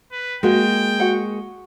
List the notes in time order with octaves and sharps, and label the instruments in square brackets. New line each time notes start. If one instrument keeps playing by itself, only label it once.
[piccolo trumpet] B4
[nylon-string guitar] G#3 A#3 [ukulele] F#4 [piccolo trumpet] G5
[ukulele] F#4 F#5